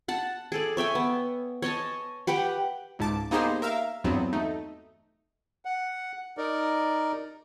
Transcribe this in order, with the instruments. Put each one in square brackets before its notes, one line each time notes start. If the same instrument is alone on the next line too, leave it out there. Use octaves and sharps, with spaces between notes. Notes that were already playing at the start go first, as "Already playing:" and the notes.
[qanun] F#5 A5
G#4 A4 D5
C#5 E5 G5 G#5
B3
C#5 D#5 G#5 A5
G4 B4 F#5 G5
[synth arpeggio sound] C#2 G#2 A5 D6
A#3 B3 D#4 G4 G#4 C5
A#4 E5 F5
E2 G2 F#3 B3 C4
A3 D#4
[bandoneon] F#5
D#4 A#4 D5